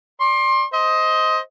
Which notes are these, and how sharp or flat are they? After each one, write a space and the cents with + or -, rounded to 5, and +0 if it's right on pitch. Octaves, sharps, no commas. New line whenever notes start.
D5 +0 C6 +30
C5 +0 D#5 +20